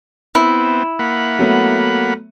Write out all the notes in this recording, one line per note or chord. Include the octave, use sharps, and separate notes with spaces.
B3 C4 E4
A#3 F#5 B5
F#3 A3 B3